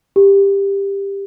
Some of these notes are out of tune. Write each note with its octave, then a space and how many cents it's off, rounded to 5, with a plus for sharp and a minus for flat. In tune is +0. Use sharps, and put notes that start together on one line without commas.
G4 +15